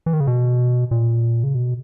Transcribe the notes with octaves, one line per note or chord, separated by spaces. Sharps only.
E3
D#3
C#3
B2
A#2
C#3
B2